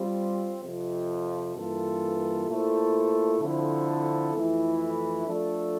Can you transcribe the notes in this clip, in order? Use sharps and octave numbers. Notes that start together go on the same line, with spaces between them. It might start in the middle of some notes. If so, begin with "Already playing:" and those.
Already playing: G3 C4 F4
F2 C3 F3
G2 E3 A#3 F4 A4
A#2 A3 E4 A4 C5
D3 F3 C4 E4 A4
F2 E3 A3 E4
F3 A3 D4 A4